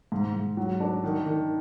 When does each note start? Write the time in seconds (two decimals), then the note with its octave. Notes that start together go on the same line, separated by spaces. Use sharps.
0.12 G#2
0.34 G#2
0.57 F#3
0.80 D4
1.04 D#3
1.26 D#3